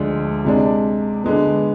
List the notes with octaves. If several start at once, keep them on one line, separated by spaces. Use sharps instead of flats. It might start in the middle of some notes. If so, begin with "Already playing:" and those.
Already playing: D2 D3 F3 G#3 D4
C3 G#3 D4
D3 G#3 B3